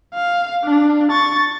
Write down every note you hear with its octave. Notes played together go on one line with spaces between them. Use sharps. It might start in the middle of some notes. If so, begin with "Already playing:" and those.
F5
D4
C#6 A6